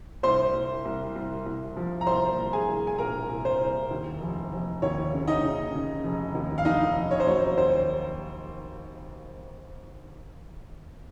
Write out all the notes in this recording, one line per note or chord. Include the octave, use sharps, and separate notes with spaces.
C2 C5 C6
C2
C2
C2
C2
F3
A#5
C2 C5 C6
C2
G#4 G#5
C2
G#5
A#2 A#4 A#5
C2
C5
C2
D#2
F1
F1
D#2 C#5
C#3
D#4 D#5
C#3
C#3
F1
D#2
F5
F1 D#4 D#5
F1
C#5
C5
F#3 C#5
D#2 C5